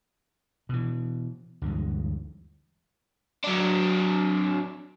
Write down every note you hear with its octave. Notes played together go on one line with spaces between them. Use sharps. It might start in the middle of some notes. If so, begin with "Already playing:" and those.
B2 E3
D2 G2 E3 G#3
F#3 D4